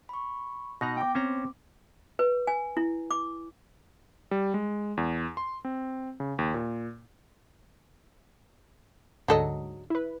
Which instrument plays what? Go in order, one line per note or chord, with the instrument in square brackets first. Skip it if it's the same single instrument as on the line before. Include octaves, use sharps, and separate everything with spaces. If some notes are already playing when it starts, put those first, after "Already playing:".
[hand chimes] B5 C#6
[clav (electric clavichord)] B2 D#4 A#5 [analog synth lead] F#6 [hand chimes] A#6
[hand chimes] B3 D6 [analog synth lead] G5
[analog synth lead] C4 [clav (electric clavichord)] C#4 C5 A#5
[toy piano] B4
G#5
E4
D6
[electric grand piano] G3
G#3
E2
C6
C4
C#3
D#2
A#2
[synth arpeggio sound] D2 G#2 D3 [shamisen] F#3 A4 D#5
[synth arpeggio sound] E4 B4